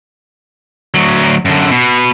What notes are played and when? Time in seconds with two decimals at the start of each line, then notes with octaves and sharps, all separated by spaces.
0.94 D2 F#3
1.45 F#2 D3
1.71 B2